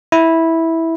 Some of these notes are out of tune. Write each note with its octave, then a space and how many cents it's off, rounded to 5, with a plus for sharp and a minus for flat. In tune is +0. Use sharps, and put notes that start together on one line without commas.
E4 -10